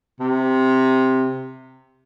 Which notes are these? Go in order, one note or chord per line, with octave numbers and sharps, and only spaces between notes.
C3